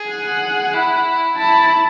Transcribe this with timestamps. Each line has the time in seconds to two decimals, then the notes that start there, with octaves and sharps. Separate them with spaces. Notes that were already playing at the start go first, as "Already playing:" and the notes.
Already playing: G#4
0.09 F#5
0.74 E4
1.38 E4 A5